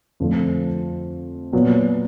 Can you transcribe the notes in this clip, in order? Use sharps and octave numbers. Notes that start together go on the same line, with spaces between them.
F2 D3 F3 A3
A#2 F#3 B3